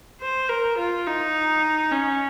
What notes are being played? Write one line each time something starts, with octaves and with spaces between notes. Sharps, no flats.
C5
A#4
F4
D#4
C#4